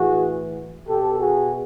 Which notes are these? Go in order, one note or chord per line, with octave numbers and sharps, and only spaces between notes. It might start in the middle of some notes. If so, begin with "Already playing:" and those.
Already playing: A2 E3 F#4 G#4
B2 G4 A4
F#4 G#4